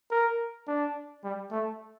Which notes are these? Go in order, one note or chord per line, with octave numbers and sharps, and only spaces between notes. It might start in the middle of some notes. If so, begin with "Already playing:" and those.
A#4
D4
G3
A3